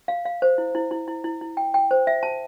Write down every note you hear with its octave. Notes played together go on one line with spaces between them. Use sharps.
F5
F5
C5
E4
E4
E4
E4
E4
E4
G5
G5
C5
E5
A5